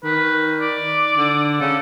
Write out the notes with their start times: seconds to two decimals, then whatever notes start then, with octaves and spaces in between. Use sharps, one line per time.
0.04 D#3 B4
0.60 D5
1.18 D3
1.61 C#3 A4